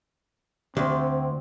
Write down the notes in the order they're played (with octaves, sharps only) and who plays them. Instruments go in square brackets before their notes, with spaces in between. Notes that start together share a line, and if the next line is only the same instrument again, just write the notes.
[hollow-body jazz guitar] D2 [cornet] C4